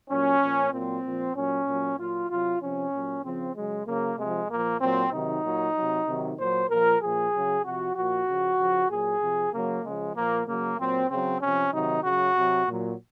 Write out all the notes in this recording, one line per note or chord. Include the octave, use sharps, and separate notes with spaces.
A#2 F#3 C#4
A#2 F3
A#2 F#3 C4
A#2 F3
A#2 F#3 C#4
A#2 F#3
A#2 F#3 F4
C3 F#3 F4
C3 F3 C#4
A#2 F#3
C#3 F3 C4
C#3 F#3 G#3
C#3 F#3 A#3
C3 F3 G#3
A#2 F3 A#3
A#2 F#3 C4
C3 D#3 F#3 D#4
A#2 F#3
C3 F#3
C3 D#3 F#3
A#2 F#3 C5
A#2 F3 A#4
A#2 F3 G#4
C#3 F#3
C3 F3 F#4
A#2 F3 F#4
C#3 F3
C#3 F3
A#2 F#3 G#4
C3 F3
C#3 F#3 A#3
C#3 F3 G#3
A#2 F3 A#3
C#3 F#3 A#3
A#2 F#3 C4
C#3 F#3 C4
C3 F3 C#4
C3 D#3 F#3 D#4
C#3 F#3 F#4
C3 F#3
A#2 F#3